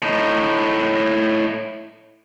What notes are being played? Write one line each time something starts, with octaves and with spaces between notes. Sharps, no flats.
A2 D#4